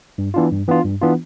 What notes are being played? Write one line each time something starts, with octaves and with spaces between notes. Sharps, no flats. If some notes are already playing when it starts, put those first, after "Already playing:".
G2
E3 B3 D4 F4
G2
E3 B3 D4 F4
G2
E3 B3 D4 F4